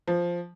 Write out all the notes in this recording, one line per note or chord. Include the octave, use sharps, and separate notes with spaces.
F3